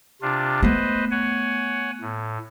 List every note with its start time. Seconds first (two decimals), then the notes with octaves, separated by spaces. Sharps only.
0.22 C3 D4 F4
0.63 A3 B3 B4 C5 D#5
1.11 C#5 F#5 G#5
2.01 A2